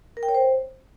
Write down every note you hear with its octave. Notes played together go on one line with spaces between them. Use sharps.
A#4
G5
C#5
C5